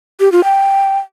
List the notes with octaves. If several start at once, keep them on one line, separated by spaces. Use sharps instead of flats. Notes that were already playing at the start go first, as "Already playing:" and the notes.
G4
F4
G5